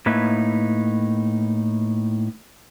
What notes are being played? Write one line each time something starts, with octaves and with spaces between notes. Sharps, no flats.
A2 A#3 D#4 B4 E5